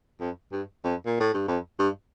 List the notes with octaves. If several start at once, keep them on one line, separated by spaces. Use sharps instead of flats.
F2
G2
F2
A#2
A2
G2
F2
G2